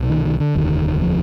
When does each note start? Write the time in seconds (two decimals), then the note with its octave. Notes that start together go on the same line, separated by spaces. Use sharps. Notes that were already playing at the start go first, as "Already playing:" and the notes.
Already playing: C2 B2
0.10 D#3
0.25 D#3
0.40 D3
0.55 F1 D#2 D3 D#3
1.02 F3